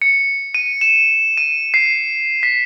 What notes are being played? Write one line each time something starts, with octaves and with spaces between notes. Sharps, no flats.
C#7
D#7
E7
D#7
C7
B6